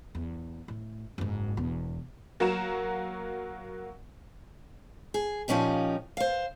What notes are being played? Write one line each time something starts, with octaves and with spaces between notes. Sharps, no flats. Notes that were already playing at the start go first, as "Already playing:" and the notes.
E2
A2
F#1 G#2
E1 E2
F#3 A#3 F#4 A#5 E7
G#4
A#2 F3 C#4 D#4 G4
C5 F5